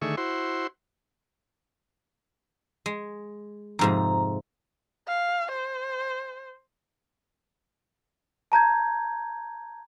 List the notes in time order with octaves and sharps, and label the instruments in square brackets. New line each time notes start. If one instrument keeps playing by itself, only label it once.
[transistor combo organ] D3 D#3 A3 G#4 E5 C#6
E4 F#4 C5 C6
[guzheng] G#3
[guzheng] F2 G#2 C3 [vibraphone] A#5
[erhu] F5
C5
[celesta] A5 A#5 G6 G#6